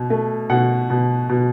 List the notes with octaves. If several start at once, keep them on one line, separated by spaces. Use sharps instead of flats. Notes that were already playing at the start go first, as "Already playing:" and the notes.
Already playing: B2
A3
B2 F#5
B2
B2